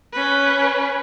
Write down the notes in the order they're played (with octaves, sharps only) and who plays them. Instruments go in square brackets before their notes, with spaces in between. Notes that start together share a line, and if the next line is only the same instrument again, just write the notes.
[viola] C#4 B4